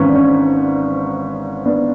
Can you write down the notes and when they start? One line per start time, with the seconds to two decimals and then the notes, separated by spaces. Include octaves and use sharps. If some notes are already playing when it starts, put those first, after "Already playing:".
Already playing: G#1 G#2 E3 C#4 B4
0.09 D4
0.15 C#4
1.65 B3 D4